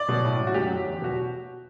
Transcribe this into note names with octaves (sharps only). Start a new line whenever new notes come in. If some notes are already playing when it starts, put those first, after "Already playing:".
Already playing: D5
B2 F#3
A2
F#3
F#4
F#2 G4
F#3
E2
B2 F#3 F#4